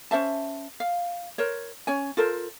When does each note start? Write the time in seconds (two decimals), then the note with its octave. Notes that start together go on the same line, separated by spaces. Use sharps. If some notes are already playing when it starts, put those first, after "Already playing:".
0.11 C#4 C5 E5 A5
0.80 F5
1.38 A#4 C5 C#5
1.87 C#4 C#5 G#5
2.17 F4 A4 A#4 C5